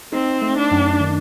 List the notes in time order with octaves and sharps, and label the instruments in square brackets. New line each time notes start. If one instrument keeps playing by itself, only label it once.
[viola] C4 [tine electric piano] D#4
[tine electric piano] A3
[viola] D4
[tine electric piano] F#2
D#3